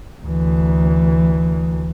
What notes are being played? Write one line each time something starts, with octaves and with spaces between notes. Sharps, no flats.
D2 E3